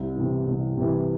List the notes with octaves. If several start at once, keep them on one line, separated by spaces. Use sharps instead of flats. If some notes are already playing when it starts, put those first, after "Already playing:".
Already playing: C2
C3 E3
C2
C3 E3